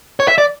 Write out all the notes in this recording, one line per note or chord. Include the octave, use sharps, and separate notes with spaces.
C#5
E5
D5